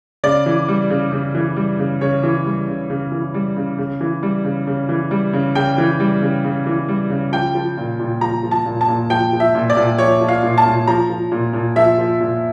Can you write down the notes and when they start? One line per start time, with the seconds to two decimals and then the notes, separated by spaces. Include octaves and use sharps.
0.24 C#3 D5
0.46 E3
0.68 G3
0.90 C#3
1.12 C#3
1.35 E3
1.56 G3
1.79 C#3
2.01 C#3 C#5
2.23 E3
2.45 G3
2.67 C#3
2.90 C#3
3.12 E3
3.34 G3
3.57 C#3
3.78 C#3
4.01 E3
4.23 G3
4.45 C#3
4.67 C#3
4.89 E3
5.11 G3
5.33 C#3
5.55 C#3 G5
5.78 E3
6.00 G3
6.22 C#3
6.44 C#3
6.66 E3
6.89 G3
7.10 C#3
7.32 F3 G5
7.55 F3
7.77 A#2
8.00 A#2
8.21 F3 A#5
8.43 F3
8.51 A5
8.66 A#2
8.81 A5
8.88 A#2
9.10 F3 G5
9.33 F3
9.40 E5
9.55 A#2
9.70 D5
9.77 A#2
9.98 F3 C#5
10.21 F3
10.28 F5
10.43 A#2
10.58 A5
10.66 A#2
10.87 F3 A#5
11.10 F3
11.32 A#2
11.53 A#2
11.76 F3 E5
11.98 F3
12.20 A#2